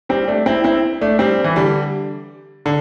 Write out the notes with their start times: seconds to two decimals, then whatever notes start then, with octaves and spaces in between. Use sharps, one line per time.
0.09 G3 C4
0.28 A3 D4
0.46 C4 E4
0.64 C4 E4
1.01 A3 D4
1.19 G3 C4
1.44 E3
1.56 D3 G3
2.66 D3